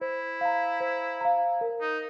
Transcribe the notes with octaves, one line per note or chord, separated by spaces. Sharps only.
E4 C5
F5 A#5
C5
F5 A#5
A#4
D#4